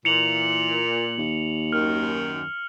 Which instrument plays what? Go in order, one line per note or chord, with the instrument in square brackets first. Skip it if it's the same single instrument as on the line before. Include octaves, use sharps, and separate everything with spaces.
[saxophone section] A#2 [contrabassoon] E3 [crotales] C#7 F7 F#7
[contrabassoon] D#2
[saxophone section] F#2 D#3 [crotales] F6